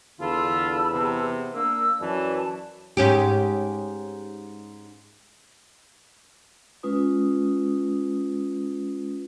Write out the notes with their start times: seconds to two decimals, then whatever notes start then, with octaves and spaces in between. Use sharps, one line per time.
0.20 E2 D3 F4 A5 B5 E6
0.92 C3 B3
1.54 A#3 D4 A#4 E6
2.01 F#2 E3 B4 C#5 D5 A5
2.97 G#2 C#4 G4
6.83 G#3 C#4 F4 B4 D#6